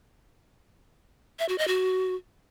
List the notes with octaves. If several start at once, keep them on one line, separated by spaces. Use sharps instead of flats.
E5
F#4
D#5
F#4